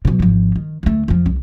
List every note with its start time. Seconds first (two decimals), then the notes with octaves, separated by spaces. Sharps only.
0.05 B2 F#3
0.20 G#1 F3
0.56 D#3
0.83 D2 A3
1.08 F2 F3
1.26 C2